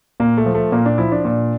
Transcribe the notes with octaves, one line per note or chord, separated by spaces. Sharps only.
A#2 A#3
A3
F3
A3
A#2 A#3
D4
F3 E4
D4
A#2